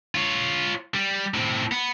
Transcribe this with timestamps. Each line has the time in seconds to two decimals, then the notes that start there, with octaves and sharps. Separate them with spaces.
0.15 F4 C#5
0.95 G3
1.34 A2 C4
1.72 B3